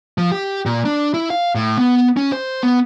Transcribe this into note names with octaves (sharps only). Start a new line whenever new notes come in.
F3
G4
A#2
D4
E4
F5
A2
B3
C#4
C5
B3